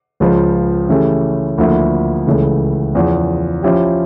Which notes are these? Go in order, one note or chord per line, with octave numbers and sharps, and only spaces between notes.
C#2 C#3 F3
C#3 E3 A3 C#4 G4
D2 D3 F3 A#3 E4
C#2 C#3 E3 A3
E2 C#3 F3
F3 C#4 E4 G4